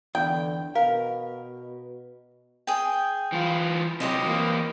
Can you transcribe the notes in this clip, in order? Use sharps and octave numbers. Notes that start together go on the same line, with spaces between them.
E2 D3 G5
B2 A#4 F5
G#4 G5
E3 F4
C3 F#3 G4 C5 D#5
E3 A#3